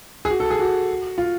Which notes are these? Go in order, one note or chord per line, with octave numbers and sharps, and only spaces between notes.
G#4
F#4
A4
G#4
F#4
F4